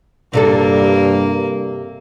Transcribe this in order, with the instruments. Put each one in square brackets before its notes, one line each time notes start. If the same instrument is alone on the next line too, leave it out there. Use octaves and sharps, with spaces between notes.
[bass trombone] G2 [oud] C3 D4 A4 [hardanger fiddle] A#3